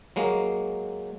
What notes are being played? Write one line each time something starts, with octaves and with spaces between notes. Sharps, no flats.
F#3 G#3 A#3